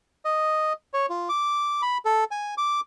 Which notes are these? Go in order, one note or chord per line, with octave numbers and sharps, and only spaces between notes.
D#5
C#5
F4
D6
B5
A4
G#5
D6